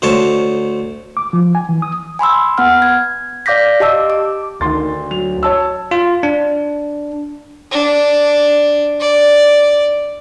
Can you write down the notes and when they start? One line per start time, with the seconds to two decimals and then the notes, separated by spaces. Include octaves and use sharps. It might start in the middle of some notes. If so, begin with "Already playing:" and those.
0.02 D2 C5 C#5 A5
1.17 D6
1.33 F3
1.55 G#5
1.69 E3
1.82 D#6
2.19 G#5 B5 C6 E6
2.58 B3 F#5 F6
2.82 G#6
3.46 D5 F5 D6 G6 A#6 B6
3.80 G4 D#5 A5 D6 E6
4.10 D6
4.61 D2 D#3 C6 A6
5.11 F#3 F7
5.43 C#5 A5 E6
5.91 F4
6.23 D4
7.71 D4
9.01 D5